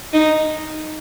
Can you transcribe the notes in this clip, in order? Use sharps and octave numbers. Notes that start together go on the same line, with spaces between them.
D#4